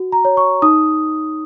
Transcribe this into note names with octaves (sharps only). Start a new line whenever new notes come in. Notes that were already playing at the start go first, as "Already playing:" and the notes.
Already playing: F#4
A#5
C#5
C#6
D#4 D#6